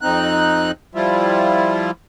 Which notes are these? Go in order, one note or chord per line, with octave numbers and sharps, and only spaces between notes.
F2 C4 D#4 F#6
F3 G3 E4 F4